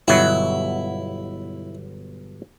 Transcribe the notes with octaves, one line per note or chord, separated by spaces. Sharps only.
G1 B2 F#3 E4